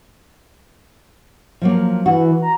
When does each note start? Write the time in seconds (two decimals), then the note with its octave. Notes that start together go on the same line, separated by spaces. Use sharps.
1.62 F3 F#3 A#3
2.06 E3 F#4
2.42 A#5